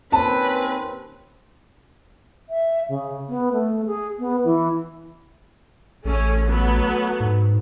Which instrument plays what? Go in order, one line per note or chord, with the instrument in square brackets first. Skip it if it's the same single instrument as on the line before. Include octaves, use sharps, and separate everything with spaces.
[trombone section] D#2 C4 C#4 [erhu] B4 [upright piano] A5
[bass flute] E5
C#3
B3
A3
G#4
B3
E3
[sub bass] A1 [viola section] A3 C#4 G#4
[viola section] F#3 A3 B3
[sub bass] G#2